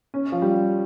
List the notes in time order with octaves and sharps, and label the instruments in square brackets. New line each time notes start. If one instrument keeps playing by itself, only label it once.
[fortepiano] C#4
F3
G3